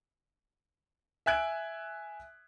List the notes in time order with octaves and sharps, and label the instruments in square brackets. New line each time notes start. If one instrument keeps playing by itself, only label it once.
[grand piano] E5 G#5 F#6 G#6 D7